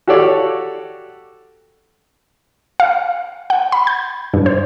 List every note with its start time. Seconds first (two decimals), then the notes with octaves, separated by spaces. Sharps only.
0.07 F#4 G4 A4 C#5 D5 F5
2.80 F5
3.50 F#5
3.72 B5
3.87 G6
4.34 G2
4.46 C5